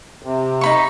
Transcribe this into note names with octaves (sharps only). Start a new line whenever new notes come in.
C3
D#4 B5 C#6